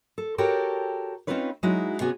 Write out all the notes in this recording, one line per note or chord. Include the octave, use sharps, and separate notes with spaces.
A4
F#4 G4 A4 A#4 C#5 G5
C4 C#4 D#4 F4 B4 C#5
F#3 G#3 D#4 E4 F#4
C3 B3 C#4 F#4 G#4 G#5